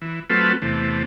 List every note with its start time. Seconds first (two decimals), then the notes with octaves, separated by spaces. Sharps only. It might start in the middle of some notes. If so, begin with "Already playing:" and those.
0.01 E3
0.30 F#3 A3 C4 F4 A4 B4
0.62 E2 C3 A3